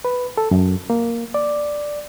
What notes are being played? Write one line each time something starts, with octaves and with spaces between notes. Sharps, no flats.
B4
A4
F#2
A#3
D5